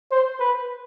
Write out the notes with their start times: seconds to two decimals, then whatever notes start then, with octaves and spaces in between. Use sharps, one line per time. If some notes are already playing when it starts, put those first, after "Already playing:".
0.11 C5
0.40 B4